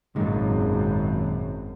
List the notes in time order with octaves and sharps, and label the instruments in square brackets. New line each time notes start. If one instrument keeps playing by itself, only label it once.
[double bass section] G#1 F#2 [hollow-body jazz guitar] A#2 D#3 G#3